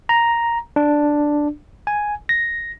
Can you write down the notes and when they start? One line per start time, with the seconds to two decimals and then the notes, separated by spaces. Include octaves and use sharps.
0.09 A#5
0.76 D4
1.87 G#5
2.29 A#6